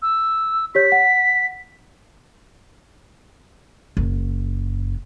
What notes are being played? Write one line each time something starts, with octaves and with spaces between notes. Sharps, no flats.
E6
G4 C#5 G6 B6
F#5
F#1